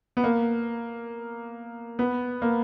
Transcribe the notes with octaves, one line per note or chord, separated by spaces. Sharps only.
B3
A#3
B3
A#3